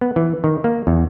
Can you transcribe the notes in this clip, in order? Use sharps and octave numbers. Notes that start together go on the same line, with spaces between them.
B3
E3
D#3
A#3
E2